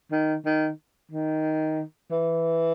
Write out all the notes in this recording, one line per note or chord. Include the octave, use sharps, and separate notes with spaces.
D#3
D#3
D#3
E3